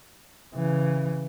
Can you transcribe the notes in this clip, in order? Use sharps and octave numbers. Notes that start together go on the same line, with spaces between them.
C#3 E3